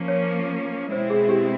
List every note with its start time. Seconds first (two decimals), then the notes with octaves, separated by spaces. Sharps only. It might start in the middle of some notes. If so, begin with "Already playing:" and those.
Already playing: F3 A#3 C#4
0.08 C#5
0.92 B2 G#3 C4 E4 C5
1.10 G#4
1.29 G4